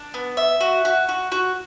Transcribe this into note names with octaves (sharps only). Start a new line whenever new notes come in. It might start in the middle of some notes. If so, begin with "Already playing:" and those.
Already playing: D4
B3
E5
F#4
F#4
F#4
F#4